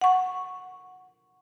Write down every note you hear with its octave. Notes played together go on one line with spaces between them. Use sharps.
F#5 C#6